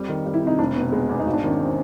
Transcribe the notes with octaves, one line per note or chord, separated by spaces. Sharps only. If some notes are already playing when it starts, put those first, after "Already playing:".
Already playing: F2 G3
D#3
G3
E4
C3 D#4
F1 D4
B2 B3
G#3 B3
E2
D#4
G#1
D4
D#3 C#4
C4